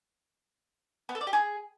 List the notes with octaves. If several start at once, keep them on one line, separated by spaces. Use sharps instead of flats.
B3
A4
D5
G4
G#4